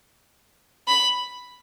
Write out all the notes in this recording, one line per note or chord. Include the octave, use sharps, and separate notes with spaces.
B5